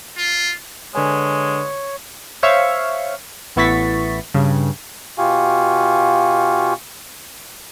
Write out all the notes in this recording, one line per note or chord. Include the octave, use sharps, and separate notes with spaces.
F4
D3 G#3 B4 C#5 G#5
C5 C#5 E5 F5 C#6
A1 B3 E4 C#6 A6 B6
G2 C#3
B2 F4 G4 F5 G#5 C#6